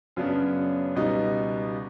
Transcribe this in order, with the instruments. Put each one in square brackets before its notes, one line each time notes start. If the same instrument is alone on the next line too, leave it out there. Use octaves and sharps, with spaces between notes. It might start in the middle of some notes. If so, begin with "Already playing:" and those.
[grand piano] F#2 C#3 F#3 B3 D4
C#2 B2 G3 B3 D#4